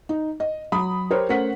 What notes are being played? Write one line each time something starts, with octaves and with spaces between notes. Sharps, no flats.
D#4
D#5
F#3 B5 D#6
G4 A#4 C5 C#5
A3 C#4 A#4 C5 F#5 B6